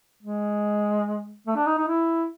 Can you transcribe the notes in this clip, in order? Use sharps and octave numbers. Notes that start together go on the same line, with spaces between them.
G#3
A3
D4
D#4
D#4
E4